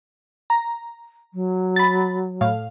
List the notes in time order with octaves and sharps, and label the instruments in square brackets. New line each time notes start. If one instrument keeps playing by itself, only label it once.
[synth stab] A#5
[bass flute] F#3
[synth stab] B5 A6
A2 F5